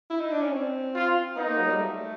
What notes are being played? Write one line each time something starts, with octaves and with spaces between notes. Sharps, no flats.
E4
D#4
D4
C#4
C4
F4
B3 D#4
A#3
F#3
G3
A3